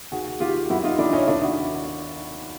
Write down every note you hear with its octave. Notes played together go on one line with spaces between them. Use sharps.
D#2 F#4 G#4
D#3 F4 G4
F#2 E4 F#4
D#4 F4
D#3 D4 E4
C#4 D#4
D#2 D4 E4
E4 F#4